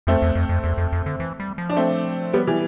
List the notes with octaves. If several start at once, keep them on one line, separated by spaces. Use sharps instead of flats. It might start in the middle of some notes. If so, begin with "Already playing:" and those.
F2 A3 C4
E2
F2
F2
E2
F2
F2
D3
E3
G3
F3
D4
A3 C4
G3 B3
E3 G3